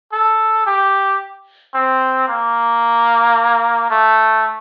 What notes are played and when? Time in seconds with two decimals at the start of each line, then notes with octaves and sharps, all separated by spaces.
0.12 A4
0.66 G4
1.74 C4
2.28 A#3
3.90 A3